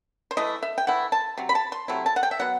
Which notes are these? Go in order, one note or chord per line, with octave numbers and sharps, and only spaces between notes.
C5
E3 A3 E4 D#5
E5
G5
E3 A3 E4 F#5
A5
C3 F#3
B5
A5
C6
C3 F#3 A3 E4
A5
F#5
G5
E5
F#3 B3 F#5